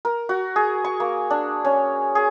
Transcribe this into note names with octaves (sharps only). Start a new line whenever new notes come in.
A#4
F#4
G#4
C#6
A#3
D4
C#4
G#4